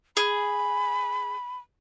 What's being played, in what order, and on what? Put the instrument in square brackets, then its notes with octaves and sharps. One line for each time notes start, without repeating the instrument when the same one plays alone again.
[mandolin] G#4 [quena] B5